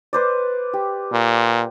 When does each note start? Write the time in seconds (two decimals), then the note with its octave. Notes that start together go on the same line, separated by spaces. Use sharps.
0.13 B4 C5 D5
0.73 G4
1.12 A#2